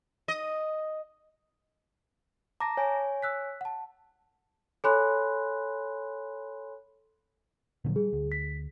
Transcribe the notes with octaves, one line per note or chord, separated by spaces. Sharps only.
D#5
A5 A#5 D6 A#6
C#5 G#5
E6 F#6 B6
F#5 A5
A4 C#5 G#5 B5 C6 F#6
A#2 D3 F#3
G3 G#4
D2
B6